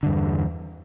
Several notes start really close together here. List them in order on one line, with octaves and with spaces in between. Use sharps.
D3 G2 E2